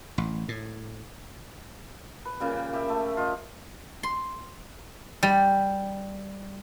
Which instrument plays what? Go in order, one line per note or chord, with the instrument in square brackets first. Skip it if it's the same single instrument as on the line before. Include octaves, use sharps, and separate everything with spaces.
[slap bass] A1
A2
[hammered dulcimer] B4
A#2 C#3 G3
G5
G4 E5
A3
F4 D#5
[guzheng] C6
G3